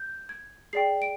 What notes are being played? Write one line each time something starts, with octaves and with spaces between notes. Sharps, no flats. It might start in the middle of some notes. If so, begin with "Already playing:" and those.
Already playing: G6
G#6
G#4 D5 G5 C7
D7